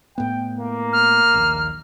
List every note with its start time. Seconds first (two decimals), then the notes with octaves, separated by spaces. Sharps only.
0.18 A2 B3 G5
0.58 A#3
0.93 F6
1.34 A#1 D#2